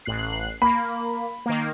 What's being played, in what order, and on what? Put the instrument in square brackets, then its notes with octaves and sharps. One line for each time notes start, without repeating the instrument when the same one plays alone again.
[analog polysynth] A1 F#6 C7
[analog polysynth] A#3 [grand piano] B5
[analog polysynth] D#3 A#3